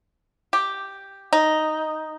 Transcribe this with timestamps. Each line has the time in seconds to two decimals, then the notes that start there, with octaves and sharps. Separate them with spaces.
0.53 G4
1.33 D#4